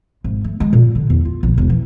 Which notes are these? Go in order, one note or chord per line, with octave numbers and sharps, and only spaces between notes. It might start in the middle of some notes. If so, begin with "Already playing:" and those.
G#1
A3
G#3
A#2
D3
E2
F4
A#1
E1
E3